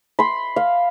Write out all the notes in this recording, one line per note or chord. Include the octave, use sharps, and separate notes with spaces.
B5 C6
F5